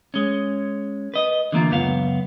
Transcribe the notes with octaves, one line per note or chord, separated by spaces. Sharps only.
G#3 C#4
B4 D#5
D3 E3 A#3 F4
C#2 F#2 B3 F5